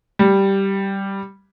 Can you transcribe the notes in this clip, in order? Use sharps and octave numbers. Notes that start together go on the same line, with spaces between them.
G3